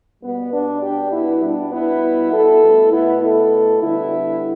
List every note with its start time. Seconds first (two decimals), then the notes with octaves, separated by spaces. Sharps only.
0.23 B2 G3 B3
0.52 D4
0.82 D4 G4
1.12 B3 E4
1.42 B2 G3 D4
1.72 B3 E4
2.33 E4 A4
2.62 B2 A3
2.92 B3 E4
3.23 E4 A4
3.83 D3 G3 B3 E4